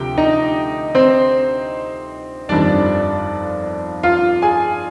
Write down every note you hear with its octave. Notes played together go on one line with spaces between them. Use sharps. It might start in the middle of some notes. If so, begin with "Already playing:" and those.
Already playing: D2 C3 F3 G4 G5
D#4 D#5
C4 C5
G1 F2 D#3 G3 D4 D5
F4 F5
G#4 G#5